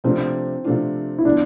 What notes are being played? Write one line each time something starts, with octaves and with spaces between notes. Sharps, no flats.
C3 F3 A3 C4 D4 F4
C3 F3 A3 D4 F4
E4
D3 F3 B3 D4